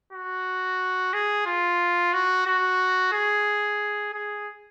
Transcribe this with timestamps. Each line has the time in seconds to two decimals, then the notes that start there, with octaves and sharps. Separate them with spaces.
0.13 F#4
1.13 G#4
1.46 F4
2.13 F#4
2.47 F#4
3.13 G#4
4.14 G#4